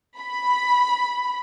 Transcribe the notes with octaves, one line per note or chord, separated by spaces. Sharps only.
B5